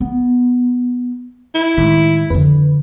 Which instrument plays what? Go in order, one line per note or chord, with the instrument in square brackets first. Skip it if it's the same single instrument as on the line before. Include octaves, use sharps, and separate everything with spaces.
[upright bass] B3
[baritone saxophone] E4
[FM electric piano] A2 D#3 B6 [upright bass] G#3
[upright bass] F2 D3 [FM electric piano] B4